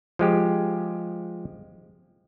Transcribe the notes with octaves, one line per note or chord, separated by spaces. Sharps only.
F3 G#3 G4